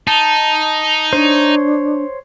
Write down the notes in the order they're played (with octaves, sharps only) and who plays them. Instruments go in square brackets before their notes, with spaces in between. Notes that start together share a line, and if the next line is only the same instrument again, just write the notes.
[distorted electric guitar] D#4 [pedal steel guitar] A5
[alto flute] D4 [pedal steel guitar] C5 C#5